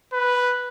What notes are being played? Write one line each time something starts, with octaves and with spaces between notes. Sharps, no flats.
B4